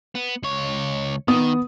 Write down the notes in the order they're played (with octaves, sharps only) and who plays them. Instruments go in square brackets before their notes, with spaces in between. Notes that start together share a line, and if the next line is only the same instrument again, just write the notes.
[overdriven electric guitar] B3
C#2 C#5
[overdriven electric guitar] D#3 [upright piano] B3 D#6